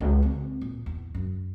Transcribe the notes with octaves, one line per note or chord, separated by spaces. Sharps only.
C#2
C4
A#2
E2
F#2